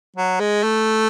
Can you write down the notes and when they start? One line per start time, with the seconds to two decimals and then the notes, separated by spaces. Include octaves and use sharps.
0.16 F#3
0.40 G#3
0.63 A3